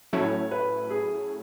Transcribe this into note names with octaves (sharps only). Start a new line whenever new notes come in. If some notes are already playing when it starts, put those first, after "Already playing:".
A2 F#3 A3 C#4 E4 C#5
B4
G#4